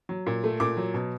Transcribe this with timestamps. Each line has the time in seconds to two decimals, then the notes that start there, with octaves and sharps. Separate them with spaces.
0.09 F#3
0.26 A#2
0.44 A3
0.60 A#2 D6
0.77 F#3
0.94 B2